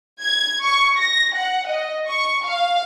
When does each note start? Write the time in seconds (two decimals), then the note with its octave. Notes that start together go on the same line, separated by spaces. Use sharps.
0.21 G#6
0.61 C#6
0.98 A#6
1.35 F#5
1.67 D#5
2.08 C#6
2.44 F5